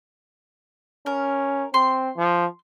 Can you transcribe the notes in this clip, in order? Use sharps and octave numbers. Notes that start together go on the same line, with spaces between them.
C#4 A#4
C4 C6
F3